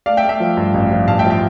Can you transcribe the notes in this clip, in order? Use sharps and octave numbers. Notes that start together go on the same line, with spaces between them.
A3 D5 F5
E5 G5
A3
E5 G5
F3
G2
A1
F3
A1 F5 A5
E5 G5
F3
E5 G5